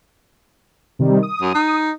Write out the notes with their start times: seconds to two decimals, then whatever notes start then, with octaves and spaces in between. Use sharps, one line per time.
0.99 C3 D#3 G3
1.23 D#6
1.42 F#2
1.55 D#4